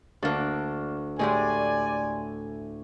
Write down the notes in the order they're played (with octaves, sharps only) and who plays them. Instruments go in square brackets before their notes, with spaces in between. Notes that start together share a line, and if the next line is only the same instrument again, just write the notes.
[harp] D2 [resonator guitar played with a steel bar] A#3 D4
[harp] A2 [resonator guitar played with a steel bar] G#3 G4 G#4 [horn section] D5 G#5